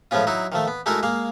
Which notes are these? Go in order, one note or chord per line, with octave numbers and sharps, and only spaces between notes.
A2 F3 G#3 B3 C#4 F4
F#3 D#4 E4 F#4
D#3 F3 A3
B3
G#3 A3 D#4 E4 F#4 A#4
G#3 A#3 F5